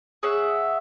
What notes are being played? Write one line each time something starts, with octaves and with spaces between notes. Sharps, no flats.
G#4 C#5 E5 F#5